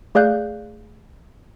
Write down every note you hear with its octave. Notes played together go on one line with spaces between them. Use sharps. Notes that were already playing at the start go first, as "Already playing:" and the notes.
A3 G#4 D5 F5 F#6 G6